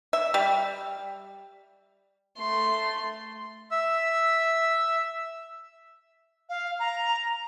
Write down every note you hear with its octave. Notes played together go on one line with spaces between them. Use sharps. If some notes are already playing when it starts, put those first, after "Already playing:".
E5
G3
A3 C6
E5 E6
F5
A#5